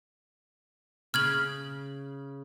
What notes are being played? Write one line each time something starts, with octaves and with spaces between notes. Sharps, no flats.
C#3 F6 G#6 F#7